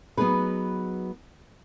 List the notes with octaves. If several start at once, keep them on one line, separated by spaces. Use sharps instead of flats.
F#3 B3 D#4 G#4 B4